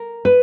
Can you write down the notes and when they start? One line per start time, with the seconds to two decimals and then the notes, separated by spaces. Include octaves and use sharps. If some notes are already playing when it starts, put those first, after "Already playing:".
Already playing: A#4
0.25 B4